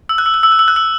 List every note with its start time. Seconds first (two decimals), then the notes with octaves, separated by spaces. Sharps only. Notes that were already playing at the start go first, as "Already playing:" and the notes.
0.09 E6
0.18 F#6
0.26 E6
0.34 F#6
0.43 E6
0.52 F#6
0.59 E6
0.68 F#6
0.76 E6